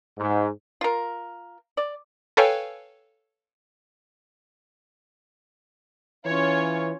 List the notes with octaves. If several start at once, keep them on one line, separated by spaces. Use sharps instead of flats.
G#2
F4 A#4
D5
A4 B4 C#5 F5 G5 G#5
E3 C#4 F4 C#5